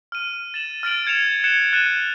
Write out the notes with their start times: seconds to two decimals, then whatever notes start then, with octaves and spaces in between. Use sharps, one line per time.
0.12 F6 D#7
0.54 A6 E7 F#7
0.83 F6 A6 D7 F#7
1.07 G#6 C#7 E7 F7
1.44 F#6 G#6 C#7 E7
1.73 F#6 A6 C#7 D#7 E7